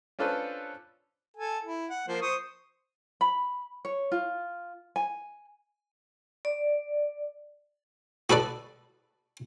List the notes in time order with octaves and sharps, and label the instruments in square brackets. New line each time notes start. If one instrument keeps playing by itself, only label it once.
[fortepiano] C#4 D4 F4 A4 B4 C5
[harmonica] A4 G#5
E4
F#5
F3 A#3 C5
C5 C#6 D#6
[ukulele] B5
C#5
F4
G#5
[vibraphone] D5
[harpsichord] F#4 A4 B4 D5